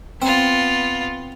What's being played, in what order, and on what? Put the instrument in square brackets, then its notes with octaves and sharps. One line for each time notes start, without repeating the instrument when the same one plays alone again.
[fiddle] B3 F4 [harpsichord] C4